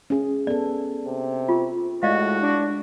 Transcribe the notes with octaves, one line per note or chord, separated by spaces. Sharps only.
C#4 G#4
B3 A4 D5
C3
F4 C#6
A2 G#3 F#4 D5 D#5 F5
D4